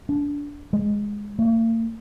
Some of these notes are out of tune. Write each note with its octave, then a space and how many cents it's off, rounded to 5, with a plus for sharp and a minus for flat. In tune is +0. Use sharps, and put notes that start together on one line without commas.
D4 -20
G#3 -5
A#3 -45